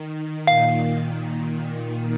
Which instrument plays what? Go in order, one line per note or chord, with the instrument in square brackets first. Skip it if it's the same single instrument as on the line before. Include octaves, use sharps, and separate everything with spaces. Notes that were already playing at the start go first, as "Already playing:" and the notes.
Already playing: [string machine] D#3
[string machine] A#2 [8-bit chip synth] F5